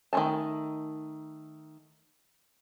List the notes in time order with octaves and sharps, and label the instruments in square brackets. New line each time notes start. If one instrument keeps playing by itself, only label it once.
[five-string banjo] D#3 A3 D#4 G#5 A5